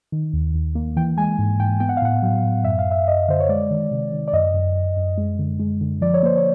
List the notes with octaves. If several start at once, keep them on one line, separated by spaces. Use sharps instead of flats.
D#3
D#2
D#2
A#3
E3 G5
G#3 G#5
G#2
G#2 G5
B3 G5
F#5
F5
A2 F#5
F#3
A2
F#2 E5
F5
F#2
E5
F#2 D#5
D3 C5
C#5
G#3 D5
D#3
C3
D#3
D5
F#2 D#5
F#2
F#2
F#2
G#3
D3
G#3
D3
F3 D5
C#5
A#3 C5
C#5